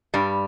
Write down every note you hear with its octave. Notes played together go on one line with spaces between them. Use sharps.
G2 G3